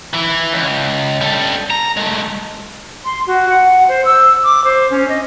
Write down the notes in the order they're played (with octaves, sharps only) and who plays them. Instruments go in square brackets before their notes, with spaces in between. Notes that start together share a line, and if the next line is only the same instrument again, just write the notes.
[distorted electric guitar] E3 E4
C#2
G3 A4
A#5
G#3 A3
[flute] C6
F#4
F#5
C5
E6
D6
C5
C#4
D#5